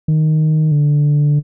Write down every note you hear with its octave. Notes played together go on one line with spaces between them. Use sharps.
D#3
D3